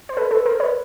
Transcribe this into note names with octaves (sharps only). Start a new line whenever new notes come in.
C5
A4 B4
A4 B4
A#4 C5
B4 C#5